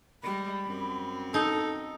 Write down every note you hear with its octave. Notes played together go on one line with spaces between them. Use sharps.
G3 G#3 B5
F#2 C4
D#4 A4